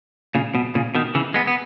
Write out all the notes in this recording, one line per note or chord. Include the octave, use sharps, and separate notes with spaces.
A#2 C#3
B2
A#2 C#3
B2 D#3
C#3 E3
G#3 B3
B3